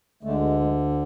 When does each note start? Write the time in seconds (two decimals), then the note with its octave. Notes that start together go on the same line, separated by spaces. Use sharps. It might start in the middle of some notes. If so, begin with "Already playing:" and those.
0.23 D2 D3 G#3 A3
0.60 G#3